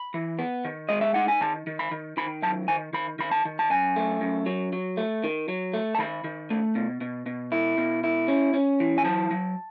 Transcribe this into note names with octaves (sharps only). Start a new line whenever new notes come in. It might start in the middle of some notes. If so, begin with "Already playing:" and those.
Already playing: B5
E3
B3
D#3
G#3 D#5
E5
D#4 F#5
G#5
D#3 A5
D#3
B5
D#3
D#3 B5
F#3 A5
D#3 G#5
D#3 B5
D#3 B5
A5
D#3
A5
F#2 G#5
A3
F#2
F#3
F#3
A3
D#3
F#3
A3
A5
D#3 B5
D#3
A3
B2
B2
B2
E4
B2
E4
C#4
C#4
E3
G#5
F#3 A5
F#3